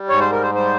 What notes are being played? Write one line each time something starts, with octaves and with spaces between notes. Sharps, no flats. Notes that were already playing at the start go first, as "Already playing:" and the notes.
Already playing: G3
G#2 C#5
C5
A#4
C5
G3 C5